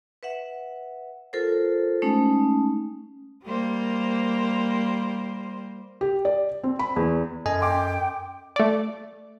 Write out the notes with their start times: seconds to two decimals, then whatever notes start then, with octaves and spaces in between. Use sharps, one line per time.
0.23 B4 E5 F#5
1.33 F4 A4 A#4 C5
2.02 G#3 A3 C#4 D#4
3.44 G3 A#3 C5
6.01 G4
6.25 D5
6.64 C4
6.79 B5
6.96 E2
7.46 F#2 A4 D#5 G#5
7.61 G5 C6 D6
8.56 A3 D5